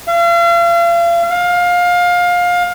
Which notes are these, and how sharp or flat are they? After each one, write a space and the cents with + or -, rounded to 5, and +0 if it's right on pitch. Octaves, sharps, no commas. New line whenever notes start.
F5 -40
F5 +20